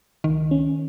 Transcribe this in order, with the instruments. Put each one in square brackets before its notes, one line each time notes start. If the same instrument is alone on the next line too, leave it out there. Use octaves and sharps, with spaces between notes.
[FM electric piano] C#2 [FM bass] D#3
[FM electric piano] C#4